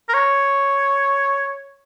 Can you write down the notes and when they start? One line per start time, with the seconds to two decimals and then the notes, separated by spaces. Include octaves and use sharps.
0.09 A#4
0.14 C#5